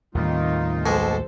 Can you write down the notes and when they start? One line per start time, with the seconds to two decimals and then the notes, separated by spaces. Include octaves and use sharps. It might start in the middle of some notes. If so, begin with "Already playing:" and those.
0.15 D#2 A2 C3 D#3 G3 D#4 F4
0.86 B1 G#3 A4 C5